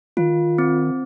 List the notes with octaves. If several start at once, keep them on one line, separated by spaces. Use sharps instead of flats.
D#3 F4
C4